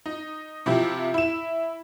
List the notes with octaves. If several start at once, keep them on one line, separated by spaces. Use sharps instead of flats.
D#4
C3 F3 E4 G4
E4 E7